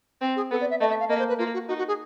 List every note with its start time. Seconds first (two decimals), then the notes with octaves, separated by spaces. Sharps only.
0.21 C4
0.36 G#4
0.51 B3 A4
0.61 D5
0.70 E5
0.80 A3 D#5
0.90 E5
1.00 F5
1.09 A#3 D#5
1.19 C5
1.29 B4
1.39 A#3 F4
1.54 F#4
1.68 D#4 F#4
1.78 F#4
1.88 G#4